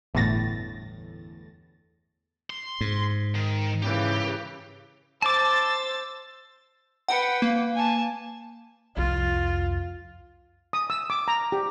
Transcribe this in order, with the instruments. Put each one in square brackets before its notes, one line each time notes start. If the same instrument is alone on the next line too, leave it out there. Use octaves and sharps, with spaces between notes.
[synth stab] G1 E2 A2 A6 A#6
[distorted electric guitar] C6
[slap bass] G#2
[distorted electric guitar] D#3
[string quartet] C#3 E3 [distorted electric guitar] G4
[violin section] C5 E6 A6 [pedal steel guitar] A5 D6
[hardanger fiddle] B4 G5 [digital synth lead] F#5
[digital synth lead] A#3
[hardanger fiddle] G#5 A5
[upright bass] C2 F2 [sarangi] F4
[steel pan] D#6
E6
D6
A#5
G4